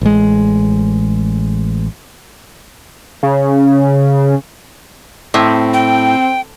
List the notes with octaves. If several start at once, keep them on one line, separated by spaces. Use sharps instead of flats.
A1 G#3
C#3
A2 C4
G5